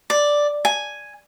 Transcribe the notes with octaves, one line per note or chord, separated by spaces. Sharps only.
D5
G#5